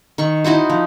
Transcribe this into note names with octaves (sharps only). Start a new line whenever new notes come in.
D#3 C#6
D#4 E4 F#4 C5
F3